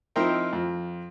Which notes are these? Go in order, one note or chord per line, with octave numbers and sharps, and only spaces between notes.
F3 C4 D#4 E4 A#4 G5
F2